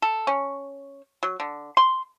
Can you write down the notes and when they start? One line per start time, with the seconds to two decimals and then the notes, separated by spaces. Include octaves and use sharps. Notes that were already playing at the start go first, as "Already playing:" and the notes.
0.02 A4
0.27 C#4
1.23 F#3
1.40 D3
1.77 C6